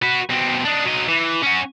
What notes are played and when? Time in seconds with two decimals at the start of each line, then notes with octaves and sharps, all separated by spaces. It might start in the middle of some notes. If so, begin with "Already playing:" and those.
0.02 F#4 B4
0.30 B2 C4
0.65 D4 D#4
0.85 F#3 D#5
1.08 E3
1.43 C#4 F#4